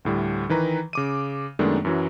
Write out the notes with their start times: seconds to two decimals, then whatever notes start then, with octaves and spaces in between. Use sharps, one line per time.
0.05 D2 A2 G3
0.49 D#3 E3 B4 A#5
0.93 C#3 D6 D#7
1.59 F#2 D#3 G#3 A3 B3 D4
1.85 F#2 E3 F#3